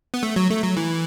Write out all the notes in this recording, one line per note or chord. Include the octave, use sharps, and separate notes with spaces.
B3
A3
F#3
A3
F#3
E3